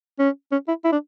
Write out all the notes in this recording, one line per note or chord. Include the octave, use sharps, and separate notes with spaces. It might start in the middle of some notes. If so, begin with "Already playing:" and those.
C#4
C#4
E4
E4
D4